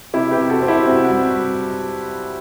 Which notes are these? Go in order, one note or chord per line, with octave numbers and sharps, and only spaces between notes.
C3 E4 G4
G4 B4
C3
F#4 A4
C4 F#4
E4 G4
C3 F#4
F#4
G3